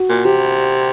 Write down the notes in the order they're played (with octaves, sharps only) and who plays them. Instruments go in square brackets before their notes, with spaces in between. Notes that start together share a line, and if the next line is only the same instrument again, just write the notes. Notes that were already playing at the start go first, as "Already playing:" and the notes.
Already playing: [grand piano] F#4
[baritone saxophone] A#2
[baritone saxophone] C3 [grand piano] G4